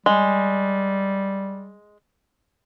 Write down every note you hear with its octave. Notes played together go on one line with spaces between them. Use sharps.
G3 G#3